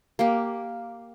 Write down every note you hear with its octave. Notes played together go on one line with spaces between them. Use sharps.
A#3 G4